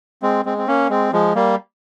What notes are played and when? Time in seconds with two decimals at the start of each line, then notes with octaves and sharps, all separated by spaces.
0.22 G#3 C4
0.45 G#3 C4
0.58 C4
0.67 A#3 C#4
0.90 G#3 C4
1.13 F3 G#3
1.35 G3 A#3